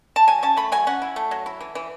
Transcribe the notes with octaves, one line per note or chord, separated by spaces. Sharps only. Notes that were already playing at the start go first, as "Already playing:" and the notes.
A5
F#3 G#5
C#4 A5
A3 B5
F#3 G#5
C#4 F#5
E4
A3
F#3
E4
E3
E3